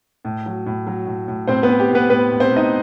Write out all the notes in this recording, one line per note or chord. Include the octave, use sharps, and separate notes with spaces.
A2
F#3
A2
F#3
A2
A2
A2 C4 C5
B3 B4
C4
G4
A2
B3 B4
A2 B3 B4
A2
C4 C5
A2
D#4 D#5